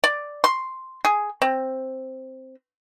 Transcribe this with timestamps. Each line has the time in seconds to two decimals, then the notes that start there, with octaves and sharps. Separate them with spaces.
0.04 D5
0.44 C6
1.05 G#4
1.42 C4